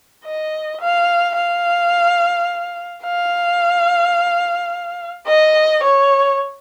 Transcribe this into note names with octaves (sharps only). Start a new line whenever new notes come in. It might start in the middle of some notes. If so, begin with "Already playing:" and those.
D#5
F5
F5
F5
D#5
C#5